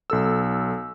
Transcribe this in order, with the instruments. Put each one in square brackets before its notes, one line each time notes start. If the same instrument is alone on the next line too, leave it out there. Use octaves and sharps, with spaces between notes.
[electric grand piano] B1 A4 E6